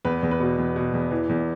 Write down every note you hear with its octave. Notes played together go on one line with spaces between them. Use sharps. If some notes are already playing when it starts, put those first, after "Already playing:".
E2 B4
E2
B4
B2
E2
B2
E2
E3
E2